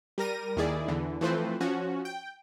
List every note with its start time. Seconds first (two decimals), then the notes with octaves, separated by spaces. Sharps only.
0.18 G3 A#4 A#6 D#7
0.57 D#2 D#3 E4 G#4 D5
0.88 E2 D3 E3
1.21 E3 F3 A3 C4 B4 C5
1.60 F3 C#4 F#4
2.05 G5